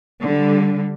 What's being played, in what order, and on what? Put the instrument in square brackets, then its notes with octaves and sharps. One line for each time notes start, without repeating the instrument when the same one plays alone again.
[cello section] D3 G3